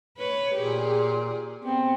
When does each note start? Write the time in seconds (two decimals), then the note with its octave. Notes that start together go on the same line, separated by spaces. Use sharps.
0.18 B4 C#5
0.56 A#2 G4 G#4
1.64 B3 C4